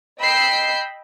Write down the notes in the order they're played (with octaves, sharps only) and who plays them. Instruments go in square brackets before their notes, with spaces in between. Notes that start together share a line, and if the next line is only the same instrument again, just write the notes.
[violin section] D#5 G5 B5 E6 G6 C7